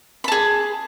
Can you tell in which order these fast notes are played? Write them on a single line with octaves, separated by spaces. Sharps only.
B5 A5 G#4